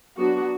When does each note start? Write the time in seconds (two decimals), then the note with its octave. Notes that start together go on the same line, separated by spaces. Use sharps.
0.17 F#3 B3 D4 F#4